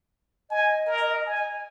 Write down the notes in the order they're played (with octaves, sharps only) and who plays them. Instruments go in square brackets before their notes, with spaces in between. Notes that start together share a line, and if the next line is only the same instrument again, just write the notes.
[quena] D#5 [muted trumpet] G#5
[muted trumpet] A#4
G#5